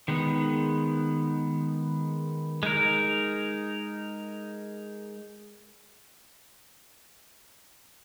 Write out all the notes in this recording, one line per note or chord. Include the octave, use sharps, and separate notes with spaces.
D#3 G#3 B3
G#3 D#4 A#4